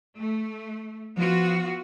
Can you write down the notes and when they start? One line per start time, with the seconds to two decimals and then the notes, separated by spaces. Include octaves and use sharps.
0.16 A3
1.17 F3 B3 F4 F#4